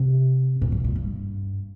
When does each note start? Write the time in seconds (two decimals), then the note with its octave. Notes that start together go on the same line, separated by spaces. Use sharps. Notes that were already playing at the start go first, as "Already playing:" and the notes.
Already playing: C3
0.62 A#2
0.72 G#2
0.84 A#2
0.96 G2